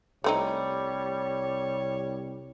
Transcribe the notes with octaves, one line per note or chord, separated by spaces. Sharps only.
C2 G3 A3 C4 D#4 C#5